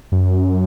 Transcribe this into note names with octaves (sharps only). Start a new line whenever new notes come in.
F#2